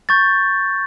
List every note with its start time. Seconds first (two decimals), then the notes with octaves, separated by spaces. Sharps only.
0.09 C#6 G6 A6